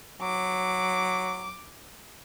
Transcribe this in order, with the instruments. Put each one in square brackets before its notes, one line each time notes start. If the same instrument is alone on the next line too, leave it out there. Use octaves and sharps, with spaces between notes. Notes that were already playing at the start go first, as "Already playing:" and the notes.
[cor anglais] F#3 [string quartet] D6